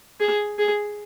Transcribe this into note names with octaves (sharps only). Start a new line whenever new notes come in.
G#4
G#4